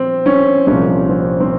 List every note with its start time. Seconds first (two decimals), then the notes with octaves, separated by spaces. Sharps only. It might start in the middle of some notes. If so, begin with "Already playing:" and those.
Already playing: A#2 F3 C4
0.26 C#4
0.67 C2 A#2 F3 C#4
1.09 C4
1.40 C4